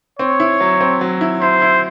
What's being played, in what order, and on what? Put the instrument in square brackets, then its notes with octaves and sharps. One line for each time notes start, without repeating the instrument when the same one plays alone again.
[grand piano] C4 [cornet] C#5
[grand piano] E4
F#3
C4
F#3
E4
[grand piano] E4 [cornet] C5
[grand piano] E4